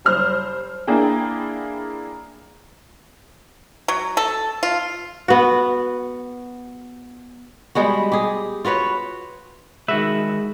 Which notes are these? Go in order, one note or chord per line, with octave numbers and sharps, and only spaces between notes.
F#1 G3 C5 F6
A#3 D4 E4 G#4 G5
F#3
A4
F4
B3 F#4
G3 G#3 B3 F#4
G4 G#4
F4 F#4 B4 C#5
D#3 G#3 F#4 B4 E5